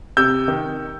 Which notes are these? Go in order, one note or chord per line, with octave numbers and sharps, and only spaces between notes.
C3 E6 G6
D#3